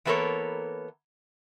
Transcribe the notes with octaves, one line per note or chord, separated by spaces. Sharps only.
E3 A#3 B3 A4 A#4 C#5